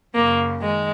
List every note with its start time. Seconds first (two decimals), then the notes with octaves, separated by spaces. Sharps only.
0.15 F#2 C#3 A#3
0.62 D#3 G#3